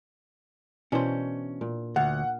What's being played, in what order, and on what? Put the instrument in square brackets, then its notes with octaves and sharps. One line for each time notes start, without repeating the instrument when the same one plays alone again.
[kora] B2 E3 D4 [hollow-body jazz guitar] C#4 C5
[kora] A#2
[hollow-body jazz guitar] D2 [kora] F5 [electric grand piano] F#5